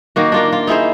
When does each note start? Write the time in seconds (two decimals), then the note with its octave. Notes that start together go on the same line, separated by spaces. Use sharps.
0.16 D#3 A#3 F#4
0.32 D4 F4 A#4
0.52 F4
0.67 D#4 E4 G#4 C5